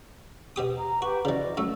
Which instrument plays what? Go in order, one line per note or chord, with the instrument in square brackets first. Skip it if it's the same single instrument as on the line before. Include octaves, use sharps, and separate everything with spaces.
[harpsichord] B2 G4 D#6
[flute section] A#5
[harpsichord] F#4 [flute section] G4 B4
[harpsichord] C#3 E3 [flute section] F#4 D5 D#5
[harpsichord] F#2 A3 [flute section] E6